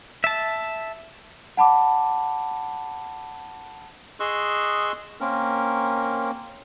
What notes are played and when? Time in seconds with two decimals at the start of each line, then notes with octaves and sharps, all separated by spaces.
0.24 E5 A5
1.57 F#5 A5 B5 D6
4.20 G#4 D#5 C6 C#6 E6 F#6
5.20 A#3 C4 C#4 A#4